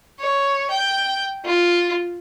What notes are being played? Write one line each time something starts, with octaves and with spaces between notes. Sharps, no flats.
C#5
G5
F4